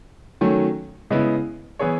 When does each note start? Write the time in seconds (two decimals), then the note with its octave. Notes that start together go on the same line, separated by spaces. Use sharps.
0.41 D#3 F#3 A3 C#4
1.10 C#3 G#3 B3 E4
1.79 E3 B3 E4 G#4 C#5